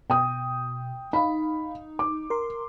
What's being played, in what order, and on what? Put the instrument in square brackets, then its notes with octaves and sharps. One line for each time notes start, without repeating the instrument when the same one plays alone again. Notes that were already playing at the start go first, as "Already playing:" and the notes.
[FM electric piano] B2 [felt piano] G5 D#6
[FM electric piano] D#4 [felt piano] F5 B5
[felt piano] D6
[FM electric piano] A#4 C6